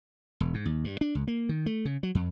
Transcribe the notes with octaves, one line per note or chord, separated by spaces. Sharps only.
E1
G#2
D#2
G2
D4
C#2
A#3
D#3
A3
C#3
F#3
F2